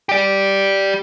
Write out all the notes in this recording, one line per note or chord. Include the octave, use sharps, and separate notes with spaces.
G4 D5